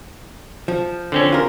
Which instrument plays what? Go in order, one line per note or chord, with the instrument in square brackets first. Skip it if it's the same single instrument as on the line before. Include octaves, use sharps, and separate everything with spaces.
[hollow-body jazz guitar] F3
[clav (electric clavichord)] D3 C4 C#4
[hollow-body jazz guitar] F4 A#4